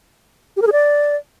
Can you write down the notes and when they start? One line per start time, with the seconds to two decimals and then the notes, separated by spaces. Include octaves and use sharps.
0.57 G4
0.62 A#4
0.67 G#4
0.72 D5